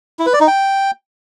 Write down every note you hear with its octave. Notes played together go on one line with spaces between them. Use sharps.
E4
B4
D5
D#4
G5